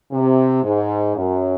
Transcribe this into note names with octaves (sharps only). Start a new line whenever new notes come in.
C3
G#2
F#2